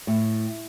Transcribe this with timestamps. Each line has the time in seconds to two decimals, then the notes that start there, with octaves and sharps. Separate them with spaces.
0.07 A2